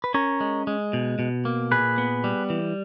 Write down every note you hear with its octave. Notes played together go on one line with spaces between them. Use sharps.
B4
C#4 A#4 C#5
G#3
G#3
B2
B2
A#3
A#2 G#4 B4
B3
G3
E3